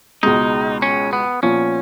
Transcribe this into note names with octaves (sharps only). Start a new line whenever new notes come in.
C#2 B2 G#3 D#4
C#4
B3
A#2 F3 B3 C#4